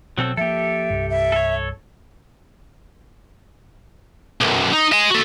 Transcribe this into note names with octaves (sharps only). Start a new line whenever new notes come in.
B2 F#3 C4 A4
F3 A#3 G4 A4 E5
C2 G2
E5
A4 C#5
B1 F#2
D#4
D#5 G#5
F#4 A4